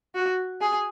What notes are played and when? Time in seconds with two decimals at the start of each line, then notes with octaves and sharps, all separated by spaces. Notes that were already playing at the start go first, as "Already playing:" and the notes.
0.15 F#4
0.61 G#4